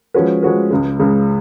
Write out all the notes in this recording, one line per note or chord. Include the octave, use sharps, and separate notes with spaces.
F3 G#3 C#4 F#4 B4
F3 G#3 C#4 F#4 B4
C#2 C#3 G#3
C#2 C#3 G#3